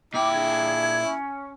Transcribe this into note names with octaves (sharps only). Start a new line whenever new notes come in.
A#2 E4 G5 D6
D4 G#4 G#6
C#4